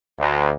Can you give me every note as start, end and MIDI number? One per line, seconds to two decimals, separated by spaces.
0.19 0.52 38